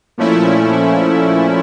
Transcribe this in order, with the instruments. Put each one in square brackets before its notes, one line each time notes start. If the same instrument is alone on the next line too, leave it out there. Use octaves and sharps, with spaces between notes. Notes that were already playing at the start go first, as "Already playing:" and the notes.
[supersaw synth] A#2 F3 A3 C#4 E4